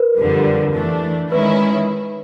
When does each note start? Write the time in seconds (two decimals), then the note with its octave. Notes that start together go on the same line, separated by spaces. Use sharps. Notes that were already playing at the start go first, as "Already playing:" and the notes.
Already playing: A#4 B4
0.18 F2 D3 G3
0.75 E3 A3 D4
1.32 D#3 G#3 C#4 E4 B4